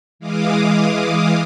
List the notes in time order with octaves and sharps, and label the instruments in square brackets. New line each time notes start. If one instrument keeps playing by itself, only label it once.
[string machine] E3 G#3 F5 D6 D#6